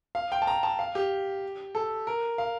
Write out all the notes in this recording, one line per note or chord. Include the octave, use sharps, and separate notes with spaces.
F5
G5
A5
A#5
A5
F5
G4
A4
A#4
F5